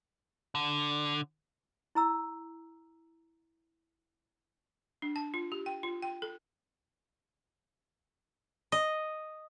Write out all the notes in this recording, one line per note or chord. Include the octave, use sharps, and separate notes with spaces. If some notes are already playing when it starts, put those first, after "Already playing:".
D3
E4 A#5 E6
D4
A5
F4
G4
G5
F4
G5
A4
D#5